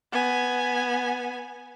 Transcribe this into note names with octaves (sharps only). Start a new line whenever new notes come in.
B3 G#5